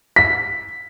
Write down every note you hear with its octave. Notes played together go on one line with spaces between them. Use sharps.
B6